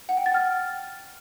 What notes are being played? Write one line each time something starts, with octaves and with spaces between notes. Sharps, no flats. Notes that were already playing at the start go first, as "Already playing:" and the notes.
F#5
G5
A6
F6